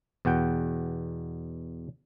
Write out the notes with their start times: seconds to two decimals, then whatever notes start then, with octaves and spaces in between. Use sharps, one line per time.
0.25 E2 B2 F#5 G5